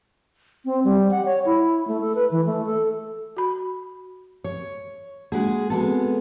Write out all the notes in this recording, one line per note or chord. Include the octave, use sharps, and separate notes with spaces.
C4
G3
F#5
C#5
E4
A3
A4
B4
E3
A3
A4
F#4 B5
C#5
G#3 A#3 D4 F#4 G#4
G#3 B3 C4 F#4 A4